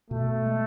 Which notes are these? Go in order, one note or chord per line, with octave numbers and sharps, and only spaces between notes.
B2 A3
G#3